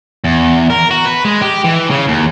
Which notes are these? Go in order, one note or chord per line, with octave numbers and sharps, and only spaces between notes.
E2
A#4
F#4
B4
G#3
G4
E3
C#3
D#2